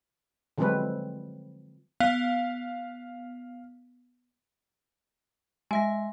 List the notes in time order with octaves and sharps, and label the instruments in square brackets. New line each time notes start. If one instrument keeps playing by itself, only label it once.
[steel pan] D3 F3 F#3 G#3 C4 B4
[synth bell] B3 [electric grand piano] F5
[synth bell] G#3 E5 A#6 [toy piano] G#5